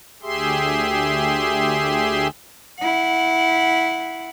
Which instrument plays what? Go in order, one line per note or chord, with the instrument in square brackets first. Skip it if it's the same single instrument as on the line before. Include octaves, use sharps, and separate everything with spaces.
[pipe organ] D2 G4 G#4 E5 C6
[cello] E4 F#5